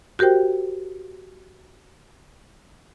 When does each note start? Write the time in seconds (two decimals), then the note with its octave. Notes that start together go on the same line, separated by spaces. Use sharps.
0.19 F#4 G4 A#4 C5 G5